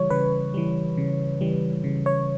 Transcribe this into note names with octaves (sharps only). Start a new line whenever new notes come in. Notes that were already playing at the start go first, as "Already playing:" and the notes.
Already playing: C#3 E3 G3 C#5
C#3 B4
E3 G3
C#3
E3 G3
C#3
C#5